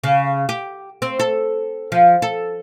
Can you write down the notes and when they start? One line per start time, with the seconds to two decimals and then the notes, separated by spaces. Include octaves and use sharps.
0.04 C#3
0.49 G4
1.02 C4
1.20 A4
1.92 F3
2.22 A4